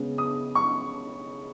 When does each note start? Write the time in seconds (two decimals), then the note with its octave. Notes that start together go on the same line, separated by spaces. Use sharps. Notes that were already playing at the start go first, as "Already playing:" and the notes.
Already playing: C#3 G#3 B3
0.18 D#6
0.55 C#6